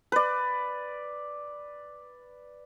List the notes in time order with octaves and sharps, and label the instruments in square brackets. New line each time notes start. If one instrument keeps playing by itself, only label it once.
[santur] B4 D5